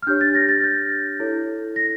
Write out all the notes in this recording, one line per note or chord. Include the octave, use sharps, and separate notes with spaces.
F6
D4 G4 C#5 G6
A6
A#6
A6
G6
E4 A4 C#5
A#6